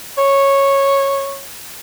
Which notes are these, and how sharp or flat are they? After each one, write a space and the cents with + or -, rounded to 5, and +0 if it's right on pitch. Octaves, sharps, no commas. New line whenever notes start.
C#5 -10